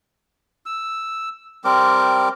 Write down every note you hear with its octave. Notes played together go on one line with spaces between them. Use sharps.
E6
G3 C4 A#4 D6